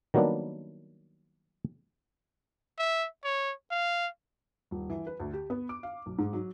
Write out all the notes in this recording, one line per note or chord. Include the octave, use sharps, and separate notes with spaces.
D#3 F#3 G3 A#3 B3 D4
E5
C#5
F5
D#1
E3
B4
D2
G4
B3
D6
F5
B1
G#2
F#3